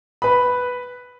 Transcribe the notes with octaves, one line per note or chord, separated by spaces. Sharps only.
B4 B5